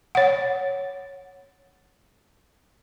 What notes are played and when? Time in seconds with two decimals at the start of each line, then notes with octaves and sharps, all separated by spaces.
0.15 C#5 F#5